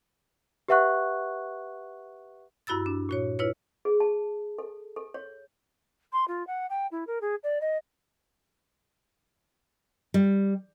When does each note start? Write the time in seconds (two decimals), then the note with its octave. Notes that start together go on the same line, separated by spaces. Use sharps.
0.68 G4 B4 E5 F#5 C#6 F#6
2.67 G2 E4 F#4 B5 E6 A6
2.86 D4
3.09 A#2 F#4 C#5
3.39 E4 F4 B4 C#5
3.85 G#4
4.00 A5
4.59 A4
4.96 A4
5.14 C#5
6.13 C6
6.28 F4
6.47 F#5
6.70 G5
6.91 E4
7.07 A#4
7.21 G#4
7.43 D5
7.61 D#5
10.14 G3